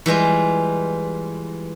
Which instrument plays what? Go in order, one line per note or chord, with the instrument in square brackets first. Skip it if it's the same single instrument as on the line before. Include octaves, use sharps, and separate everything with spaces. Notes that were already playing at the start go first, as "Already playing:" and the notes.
[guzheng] E3 G3 G#3 F4